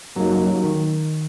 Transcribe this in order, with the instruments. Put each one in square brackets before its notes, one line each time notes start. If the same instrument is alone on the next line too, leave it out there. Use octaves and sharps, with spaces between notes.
[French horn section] F#2 C#3 A#3 D#4 [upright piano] F#3
[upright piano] F#3
F#3
D#3